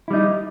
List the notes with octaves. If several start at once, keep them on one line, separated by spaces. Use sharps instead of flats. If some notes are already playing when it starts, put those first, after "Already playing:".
G3 D#4 E4